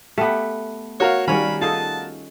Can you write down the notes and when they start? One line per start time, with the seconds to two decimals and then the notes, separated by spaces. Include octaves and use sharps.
0.18 A3 B3 G4
1.00 F#4 A#4 C#5 F5
1.28 D#3 G3 C#4 C#5 D5 B5
1.62 D#4 F4 G#4 A4 A5